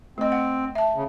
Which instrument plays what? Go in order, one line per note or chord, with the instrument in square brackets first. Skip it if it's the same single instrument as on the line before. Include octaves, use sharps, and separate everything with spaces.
[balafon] A3 D#5 [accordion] C4
[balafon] F#5
E5 A5
[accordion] C#3